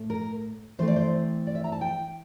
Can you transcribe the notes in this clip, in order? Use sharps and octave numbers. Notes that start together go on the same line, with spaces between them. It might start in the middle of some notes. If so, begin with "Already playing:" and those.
Already playing: A2 A3
A#4
E3 A3 C4 C5
D5
C5
D5
E5
A#5
A5
G5